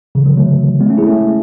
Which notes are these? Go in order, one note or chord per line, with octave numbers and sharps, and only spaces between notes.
C#3 E3
D3 F#3
F#3 A3
G#3 B3
A3 C#4
E4 G#4
A3 C#4